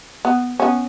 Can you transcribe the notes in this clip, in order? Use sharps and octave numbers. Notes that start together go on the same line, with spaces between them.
B3
B3 C#4